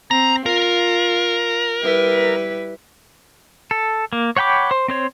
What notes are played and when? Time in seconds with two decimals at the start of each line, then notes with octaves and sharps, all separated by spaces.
0.11 C4 A#5
0.46 F4 A#4
1.83 G3 E4 B4
3.71 A4
4.13 A#3
4.37 C#5 F#5 G5 B5 D6
4.71 C5
4.88 C4 C5 C#5